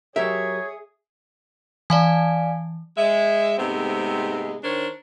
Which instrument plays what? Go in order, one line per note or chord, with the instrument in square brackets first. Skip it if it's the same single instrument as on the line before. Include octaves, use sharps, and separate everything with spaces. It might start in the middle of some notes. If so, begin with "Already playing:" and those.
[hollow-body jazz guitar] F#3 G4 A#4 [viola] G#4 [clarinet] C#5 [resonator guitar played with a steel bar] E5
[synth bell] E3 [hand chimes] D5 F5 G#5
[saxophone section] G#3 E5
G#2 C3 G#3 A3 B3 C4
D#3 D4 A#4 C5 C#5